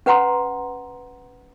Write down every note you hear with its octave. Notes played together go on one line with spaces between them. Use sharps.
C#4 B4 F#5 A#5 C6